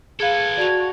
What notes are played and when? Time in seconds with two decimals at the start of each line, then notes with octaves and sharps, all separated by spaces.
0.20 G#4 A4 B4 F5 G#6
0.57 F#4 D5 A5 F7